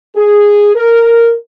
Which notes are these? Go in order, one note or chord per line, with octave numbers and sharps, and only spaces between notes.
G#4
A#4